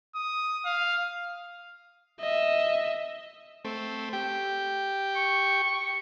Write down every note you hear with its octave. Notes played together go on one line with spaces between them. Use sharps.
D#6
F5
D#5 E5
A3 C4
G4 G5
C#6